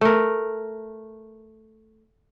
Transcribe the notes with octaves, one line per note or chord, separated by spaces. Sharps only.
A3 A#4